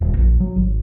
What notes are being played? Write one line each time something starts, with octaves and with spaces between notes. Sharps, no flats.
D#1
A#1
F#3
G#1